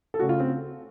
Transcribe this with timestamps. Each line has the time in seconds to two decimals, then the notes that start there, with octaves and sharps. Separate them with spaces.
0.14 A4
0.19 C#3 A3 F#4
0.29 F4
0.40 C4